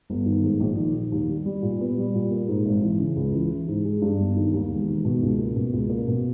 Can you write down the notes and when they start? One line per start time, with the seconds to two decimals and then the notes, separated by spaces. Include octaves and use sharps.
0.10 G1
0.26 D#3
0.43 G#2
0.60 A#1
0.77 D#3
0.95 D#3
1.12 D#2
1.29 G3
1.46 G3
1.62 A#2
1.81 B3
1.98 G3
2.15 A#2
2.31 A#3
2.48 G#2
2.66 G#1
2.82 E3
2.99 C#3
3.16 C#2
3.33 E3
3.52 E3
3.68 G#2
3.85 G#3
4.02 G2
4.20 G1
4.37 D#3
4.54 D#2
4.70 E1
4.88 D#3
5.05 B2
5.22 C#2
5.39 A#3
5.56 B2
5.73 C#2
5.90 A#3
6.08 B2